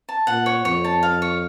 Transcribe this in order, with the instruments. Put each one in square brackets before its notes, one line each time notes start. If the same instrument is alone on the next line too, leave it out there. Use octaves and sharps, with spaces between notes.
[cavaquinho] A5
[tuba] A#2 [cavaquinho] F#5
[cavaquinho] C#5
[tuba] F2 [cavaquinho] C#5
[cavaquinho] A5
F5
C#5